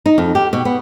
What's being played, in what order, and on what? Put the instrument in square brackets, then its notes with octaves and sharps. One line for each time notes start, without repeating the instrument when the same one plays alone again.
[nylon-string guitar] D#4
F2
G4
B2
B3